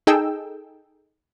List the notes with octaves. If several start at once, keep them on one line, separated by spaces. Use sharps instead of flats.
D#4 G#4 A4 D#5 G5 E6